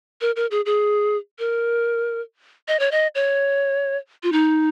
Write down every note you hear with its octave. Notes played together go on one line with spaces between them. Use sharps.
A#4
A#4
G#4
G#4
A#4
D#5
C#5
D#5
C#5
F4
D#4